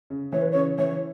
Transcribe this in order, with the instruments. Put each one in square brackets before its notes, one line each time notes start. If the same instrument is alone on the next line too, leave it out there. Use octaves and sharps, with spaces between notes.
[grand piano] C#3
[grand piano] E3 [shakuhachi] C#5
[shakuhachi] B4
C#5
[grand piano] C#3
[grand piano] E3 [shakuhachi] C#5